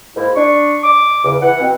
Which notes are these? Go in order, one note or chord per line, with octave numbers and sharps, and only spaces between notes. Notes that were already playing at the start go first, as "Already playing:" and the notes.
G#2 A#3 E4
D4 C#6
D6
E2 C#3
E3 F#5
B2 C4